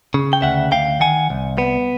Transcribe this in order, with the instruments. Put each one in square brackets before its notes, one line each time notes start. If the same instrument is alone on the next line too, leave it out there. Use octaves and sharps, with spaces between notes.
[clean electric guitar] C#3
G5
D2 E5 F#5
D2 F5 G5
D#3 F#5 G#5
C2
B3